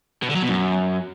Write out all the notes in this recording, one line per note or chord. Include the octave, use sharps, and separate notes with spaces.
B2
D3
F#3
B2
F#2